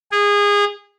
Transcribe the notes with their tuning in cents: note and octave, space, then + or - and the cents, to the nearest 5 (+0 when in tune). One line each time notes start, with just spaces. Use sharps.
G#4 -25